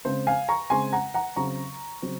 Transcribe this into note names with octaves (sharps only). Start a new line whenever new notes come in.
C#3 G#3 C4 C5
F5 G#5
A#5 C#6
C#3 G#3 C4 G#5 C6
F#5 A#5
F#5 A#5
C#3 F#3 C4 A#5 C#6
C#3 F#3 C4